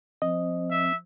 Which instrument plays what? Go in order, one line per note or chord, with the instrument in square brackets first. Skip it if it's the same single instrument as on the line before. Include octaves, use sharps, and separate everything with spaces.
[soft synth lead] F3 [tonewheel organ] C4 [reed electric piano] D#5
[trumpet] E5